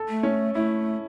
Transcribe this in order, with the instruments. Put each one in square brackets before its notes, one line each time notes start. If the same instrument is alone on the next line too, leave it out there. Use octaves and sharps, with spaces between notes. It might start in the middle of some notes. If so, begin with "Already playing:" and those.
Already playing: [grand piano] A4
[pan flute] A3
[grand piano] C#4
[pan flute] A3 [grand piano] E4